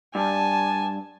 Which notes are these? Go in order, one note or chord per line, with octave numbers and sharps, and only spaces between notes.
G2 G#5 A5